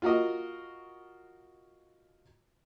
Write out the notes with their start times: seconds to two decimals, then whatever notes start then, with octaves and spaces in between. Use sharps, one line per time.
0.02 F4 F#4 A#4 D#5